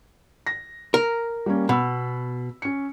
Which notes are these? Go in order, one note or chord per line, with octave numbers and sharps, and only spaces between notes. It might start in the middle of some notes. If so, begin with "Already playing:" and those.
A#6
A#4
G3 A#3 C#4
B2 B5 E6
C#4 C#7